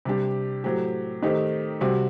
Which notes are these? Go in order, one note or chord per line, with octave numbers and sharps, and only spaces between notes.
C3 G3 D4 G4
A2 F#3 C4 G4
D#3 A3 C4 D#4 G4
C3 G3 C4 F#4